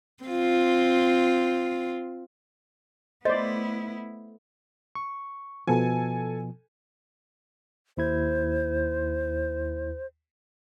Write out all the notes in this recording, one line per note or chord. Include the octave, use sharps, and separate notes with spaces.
C4 F4
A3 B3 E4 C5 D5 D#5
C#6
B2 F3 A4 G#5
D#2 E4 C5 G#6